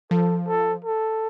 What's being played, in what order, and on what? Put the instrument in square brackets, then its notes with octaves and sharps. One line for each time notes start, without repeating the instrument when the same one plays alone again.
[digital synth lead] F3 [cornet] A4
[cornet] A4
A4